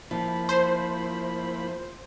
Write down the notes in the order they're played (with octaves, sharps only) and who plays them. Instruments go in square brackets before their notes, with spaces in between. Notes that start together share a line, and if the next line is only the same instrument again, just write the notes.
[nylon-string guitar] F3 [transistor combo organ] A#3 E4 B5
[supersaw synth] C5